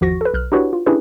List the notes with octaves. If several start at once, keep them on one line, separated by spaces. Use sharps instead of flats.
G#1 E2 F3 F#4 C#6 A#6
A4 B4
B1 F6 F#6
D4 E4 F#4 G4 B4 C#5
F4
C#4 D4 E4 G4 G#4 B4